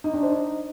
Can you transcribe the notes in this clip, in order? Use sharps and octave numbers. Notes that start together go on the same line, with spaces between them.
D#4
D4
C5
D#4